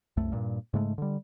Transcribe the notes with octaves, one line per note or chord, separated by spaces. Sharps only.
C2 F#2 A3
G2 A#2
G#2 C#3 G#3 A3
D3 G3